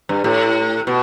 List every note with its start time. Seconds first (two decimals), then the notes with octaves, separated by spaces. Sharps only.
0.09 G2
0.24 A2
0.87 B2